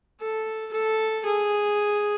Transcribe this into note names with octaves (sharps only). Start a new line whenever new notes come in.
A4
A4
G#4